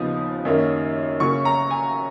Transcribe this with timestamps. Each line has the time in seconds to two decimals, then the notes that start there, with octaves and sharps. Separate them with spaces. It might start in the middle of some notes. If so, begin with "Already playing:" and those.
Already playing: D#2 C#3 F3 B3 D#4 D#6
0.45 F#2 D#3 A#3 C#4
1.20 C#3 F#3 A#3 C#4 C#6
1.45 A#5
1.71 G#5